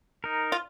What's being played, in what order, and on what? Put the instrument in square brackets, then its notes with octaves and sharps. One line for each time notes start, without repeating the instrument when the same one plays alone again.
[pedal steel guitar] D#4 A#4
[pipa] F4